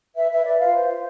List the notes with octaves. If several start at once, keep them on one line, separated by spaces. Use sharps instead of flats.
B4 E5
B4 E5
B4 D5
F4 F5
C5
F4